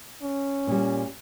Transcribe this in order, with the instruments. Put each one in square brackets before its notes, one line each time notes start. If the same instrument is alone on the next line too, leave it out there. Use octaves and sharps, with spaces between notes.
[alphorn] C#4
[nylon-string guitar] A#2 G3